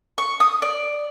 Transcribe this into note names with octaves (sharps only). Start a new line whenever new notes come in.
C#6
D#6
D5